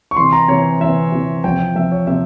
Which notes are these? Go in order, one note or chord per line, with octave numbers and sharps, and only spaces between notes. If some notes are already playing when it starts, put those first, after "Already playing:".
C#6
C3 E3 C6
A#5
C3 E3 C#5
C3 E3 E5
C3 E3
C3 F3 G5
C3 F3 E5
C#5
C3 E5